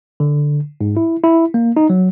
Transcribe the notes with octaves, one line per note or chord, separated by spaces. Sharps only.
D3
G#2
E4
E4
A#3
D#4
F#3